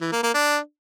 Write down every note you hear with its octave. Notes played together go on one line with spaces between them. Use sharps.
E3
A#3
A#3
D4